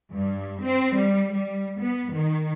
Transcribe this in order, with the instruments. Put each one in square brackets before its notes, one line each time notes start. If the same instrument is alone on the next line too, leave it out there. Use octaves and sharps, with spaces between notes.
[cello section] G2
C4
G3
G3
B3
D#3